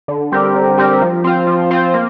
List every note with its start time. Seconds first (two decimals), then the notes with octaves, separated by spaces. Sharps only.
0.08 D3
0.32 G3 C4 G4 A#4
0.54 D3
0.78 G3 C4 G4 A#4
1.01 F3
1.24 C4 F4 C5
1.47 F3
1.71 C4 F4 C5
1.94 A#3